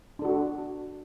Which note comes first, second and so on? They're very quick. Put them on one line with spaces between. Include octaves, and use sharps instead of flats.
D4 A4 F#4